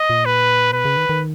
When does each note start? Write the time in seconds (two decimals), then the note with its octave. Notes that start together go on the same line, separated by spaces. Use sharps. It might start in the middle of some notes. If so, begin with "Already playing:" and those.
Already playing: D#5
0.10 A#2
0.26 B4
0.73 B2 B4
0.85 C#3
0.97 D#3
1.09 D#3